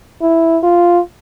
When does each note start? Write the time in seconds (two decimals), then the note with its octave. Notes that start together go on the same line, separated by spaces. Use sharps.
0.21 E4
0.63 F4